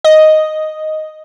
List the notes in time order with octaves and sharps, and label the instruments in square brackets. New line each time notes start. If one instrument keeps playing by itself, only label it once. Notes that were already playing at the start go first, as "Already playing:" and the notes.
[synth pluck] D#5